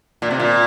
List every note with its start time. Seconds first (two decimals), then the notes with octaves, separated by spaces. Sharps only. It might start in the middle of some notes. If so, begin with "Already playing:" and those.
0.22 A#2
0.30 C3
0.40 A#2